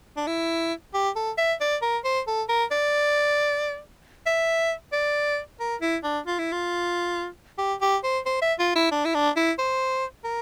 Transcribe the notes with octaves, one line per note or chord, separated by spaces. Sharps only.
D4
E4
G4
A4
E5
D5
A#4
C5
A4
A#4
D5
E5
D5
A#4
E4
D4
F4
E4
F4
G4
G4
C5
C5
E5
F4
E4
D4
E4
D4
E4
C5
A#4